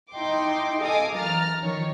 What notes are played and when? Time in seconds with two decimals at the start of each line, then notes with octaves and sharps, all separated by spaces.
0.12 D#4 E4 G5 C6 D6
0.82 A4 D#5 F5 G#5 D6 D#6
1.16 F#2 E3 A#5 F6 A6
1.63 D#3 F3 C#5